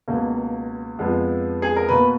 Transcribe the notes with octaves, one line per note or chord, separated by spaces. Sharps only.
C#2 B2 A#3
F2 F3 G#3 B3
G#4
A#4
B2 A#3 B4